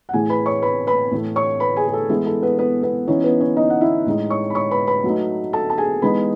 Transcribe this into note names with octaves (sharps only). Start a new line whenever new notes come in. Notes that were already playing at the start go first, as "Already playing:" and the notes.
F#5
A2 E3 A3 G#4 G#5
B4 B5
C#5 C#6
B4 B5
B4 B5
A2 E3 A3
C#5 C#6
B4 B5
G#4 G#5
G#4
A4
E3 G#3 B3 E4 G#4
A4
B3 B4
B3 B4
B3 B4
E3 B3 C#4 D#4 C#5
B3 B4
C#4 C#5
D#4 D#5
F#5
E4 E5
A2 G#3 D#4
C#5 C#6
B5
C#5 C#6
B4 B5
B4 B5
F#3 A3 D#4
A4 A5
A5
G#4 G#5
E3 G#3 B3 D#4 B4 B5